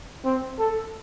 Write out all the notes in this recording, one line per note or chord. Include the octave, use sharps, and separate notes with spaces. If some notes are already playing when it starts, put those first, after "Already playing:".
C4
A4